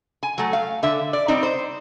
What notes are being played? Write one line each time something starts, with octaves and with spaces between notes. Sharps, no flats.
G#5
F#3 A3
F5
D3 E5
D5
G3 C4 D#4
C5